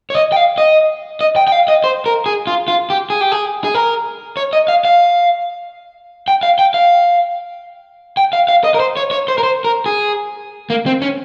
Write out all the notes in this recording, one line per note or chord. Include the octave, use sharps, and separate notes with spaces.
C#5
D#5
G5
F5
D#5
D#5
G5
G5
F5
D#5
C5
A#4
G#4
F4
F4
G4
G#4
G4
G#4
G#4
A#4
C#5
D#5
F5
F5
G5
F5
G5
F5
G5
F5
F5
D#5
A#4
C5
C#5
C#5
C5
A#4
C5
A#4
G#4
A#3
C4
C#4